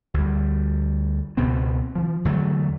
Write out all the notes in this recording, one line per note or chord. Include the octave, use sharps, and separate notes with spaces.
D2 G3
C#2 B2 B3 C4
E3 F3
E2 D3 F#3 A3